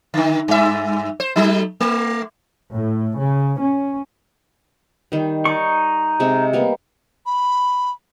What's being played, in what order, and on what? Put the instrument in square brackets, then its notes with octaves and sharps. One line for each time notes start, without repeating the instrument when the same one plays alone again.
[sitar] D3 D#3
G2 E5
C5
F#3 A3 D#4
A3
[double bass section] A2
C#3
C#4
[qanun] D#3 G3
[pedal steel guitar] D#4 C#6 [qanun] D5
[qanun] C3 G#3 C4
G3 A#3 B3
[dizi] B5